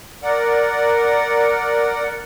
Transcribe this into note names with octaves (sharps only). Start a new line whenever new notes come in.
A#4 D5 F#5